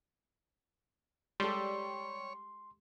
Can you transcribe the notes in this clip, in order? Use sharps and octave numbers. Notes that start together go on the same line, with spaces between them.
G3 G#3 G4 A4 C#5 C6